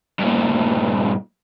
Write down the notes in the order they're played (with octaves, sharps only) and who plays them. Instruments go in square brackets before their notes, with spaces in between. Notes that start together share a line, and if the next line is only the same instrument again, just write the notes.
[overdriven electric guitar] G2 A#2